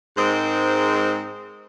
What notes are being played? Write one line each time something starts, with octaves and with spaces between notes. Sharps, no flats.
G#2 G#3 C4 A#4 C5